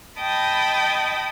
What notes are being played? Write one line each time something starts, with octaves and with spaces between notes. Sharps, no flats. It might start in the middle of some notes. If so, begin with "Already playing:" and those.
D#5 G5 A5 B5 D#6